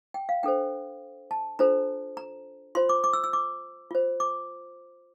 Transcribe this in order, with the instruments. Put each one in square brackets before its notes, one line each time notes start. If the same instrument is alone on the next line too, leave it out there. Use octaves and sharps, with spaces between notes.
[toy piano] G5
F5
D4 A4 C5 G5
A5
D4 F4 A4 C5 A#5
A#5
F4 C5 C6
D6
D6
E6
E6
D6
F4 C5
D6